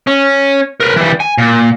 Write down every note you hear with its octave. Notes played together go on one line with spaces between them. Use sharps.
C#4
A#4 B4
E3 G3
G#5
A#2